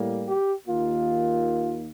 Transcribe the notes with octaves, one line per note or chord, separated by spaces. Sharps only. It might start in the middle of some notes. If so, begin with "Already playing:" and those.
Already playing: A2 G3 A#3
G4
D#2 D#3 A#3 F4